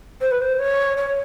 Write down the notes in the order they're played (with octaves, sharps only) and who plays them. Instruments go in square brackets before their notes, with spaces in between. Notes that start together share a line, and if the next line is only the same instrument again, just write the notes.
[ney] C5
B4
C5
C#5
C#5